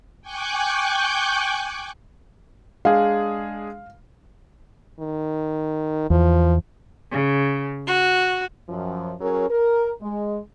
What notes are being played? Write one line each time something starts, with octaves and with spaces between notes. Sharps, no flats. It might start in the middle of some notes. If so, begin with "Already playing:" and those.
G5 G#5 C#6 D6 F#6 G6
G#3 D4 G#4 F5
D#3
E2 F3
C#3
F#4
F#2 F3
F#3 C#4 G#4 A#4
A#4
G#3